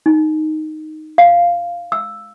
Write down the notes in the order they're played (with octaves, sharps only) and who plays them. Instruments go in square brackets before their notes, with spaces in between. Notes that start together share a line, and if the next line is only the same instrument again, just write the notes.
[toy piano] D#4
F5
E6